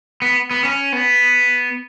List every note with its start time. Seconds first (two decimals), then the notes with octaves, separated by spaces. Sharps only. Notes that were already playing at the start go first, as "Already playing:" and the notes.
0.22 B3
0.51 B3
0.65 C#4
0.93 B3